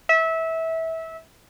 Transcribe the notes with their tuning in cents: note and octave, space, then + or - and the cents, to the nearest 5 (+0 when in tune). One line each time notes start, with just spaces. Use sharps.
E5 -20